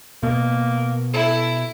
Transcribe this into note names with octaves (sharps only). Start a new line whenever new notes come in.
B2 A#3
E4 A4